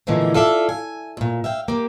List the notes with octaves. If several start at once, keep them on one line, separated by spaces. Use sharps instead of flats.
A#2 D3 E3 F3 G#3 A3
F4 A4 D5 E5
G#5
E2 A#2
E5 F5 G5
A#3 G4